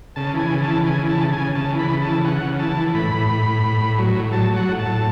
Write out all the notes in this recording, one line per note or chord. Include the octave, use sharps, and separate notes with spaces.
C#3 A5
E3
G#5
C#3
A5
E3
C#3 G#5
E3
A5
C#3
G#5
C#3
C#3 A5
E3
B5
C#3
A5
E3
C#3 F#5
C#3
E3 A5
E3
A2 B5
A2
A2
A2
A2
A2
F#3
A2
F#3 A5
F#3
F#5
A2
A5
A2